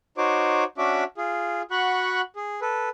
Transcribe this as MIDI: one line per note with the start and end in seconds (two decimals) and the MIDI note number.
0.18 0.64 63
0.18 0.64 66
0.18 0.64 72
0.18 0.64 73
0.18 0.64 86
0.78 1.04 61
0.78 1.04 62
0.78 1.04 66
0.78 1.04 76
0.78 1.04 86
1.17 1.62 65
1.17 1.62 68
1.71 2.21 66
1.71 2.21 78
1.71 2.21 83
1.71 2.21 85
1.71 2.21 90
2.36 2.60 68
2.61 2.89 69
2.61 2.89 71